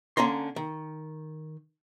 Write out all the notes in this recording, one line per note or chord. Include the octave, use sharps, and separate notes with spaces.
D3 A#3 C#4 A#5 C6
D#3